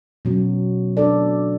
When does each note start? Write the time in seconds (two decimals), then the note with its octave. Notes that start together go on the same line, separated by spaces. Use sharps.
0.25 B2 F#3 C#4
0.97 B3 D4 A4 D5